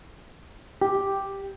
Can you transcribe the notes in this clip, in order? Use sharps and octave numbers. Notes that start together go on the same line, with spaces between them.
G4